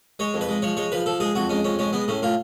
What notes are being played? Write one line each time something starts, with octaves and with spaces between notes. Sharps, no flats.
G#3 C#5
F2
B4
G#3
F3 C#5
G#3 C#5
F3 B4
F3 A4
G#3 G#4
F2 F#4
G#3 C#4
F2 C#4
G#3 C#4
G#3 B3
A2 C#4
A2 F4